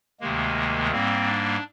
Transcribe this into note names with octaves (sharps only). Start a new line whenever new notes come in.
D2 C3 D#3 G#3 A#3
G#2 G3 A#3 C4
D4